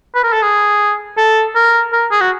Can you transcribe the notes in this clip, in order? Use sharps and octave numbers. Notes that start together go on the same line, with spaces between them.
B4
A#4
A4
G#4
A4
A#4
A#4
G#4
F#4